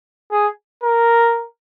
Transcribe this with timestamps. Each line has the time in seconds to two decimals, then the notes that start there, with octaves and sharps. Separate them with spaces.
0.31 G#4
0.83 A#4